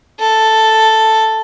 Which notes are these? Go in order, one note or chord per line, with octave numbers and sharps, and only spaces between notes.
A4